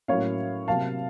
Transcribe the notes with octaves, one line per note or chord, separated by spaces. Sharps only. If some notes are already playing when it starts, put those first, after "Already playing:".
A2 F#3 A#3 C#4 C#5 F5
C3 F#3 A#3 F5 A5